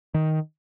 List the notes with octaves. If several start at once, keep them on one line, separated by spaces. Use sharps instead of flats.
D#3